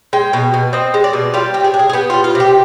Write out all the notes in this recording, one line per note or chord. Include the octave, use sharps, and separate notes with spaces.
G#3 G5
B2
B2
C4 D#5
G#3
D5
B2
G3 F4
C3 G4
G#4
D4
G#4
G#4
B3 G4
G3 F4
F4
C3
G4